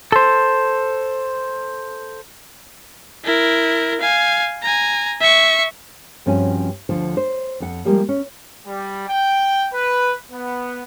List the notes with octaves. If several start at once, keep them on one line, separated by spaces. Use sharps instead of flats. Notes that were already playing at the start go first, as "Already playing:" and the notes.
A4 C5
E4 A#4
F5 G#5
G#5 A#5
E5 C#6
G2 F3 C4 C#4 F#4 G#5
D2 D3 F3 C5
C5
F2 F#5
F3 G3 G#3 A#3 G4
C#4
G3
G5
B4
B3